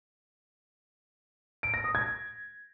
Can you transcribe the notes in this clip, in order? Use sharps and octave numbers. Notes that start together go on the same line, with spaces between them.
D7
A#6
D#6
G#6